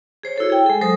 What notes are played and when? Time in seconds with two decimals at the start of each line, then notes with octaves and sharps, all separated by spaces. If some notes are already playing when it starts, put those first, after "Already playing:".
0.23 G#4 C5 C#5
0.36 E4 F#4 A4 C#5
0.50 G#4 G5
0.66 G#3 A4
0.81 F#3 A4 C5 D#6